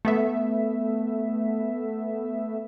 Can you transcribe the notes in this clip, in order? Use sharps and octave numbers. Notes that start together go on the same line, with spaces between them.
A3 B3 E5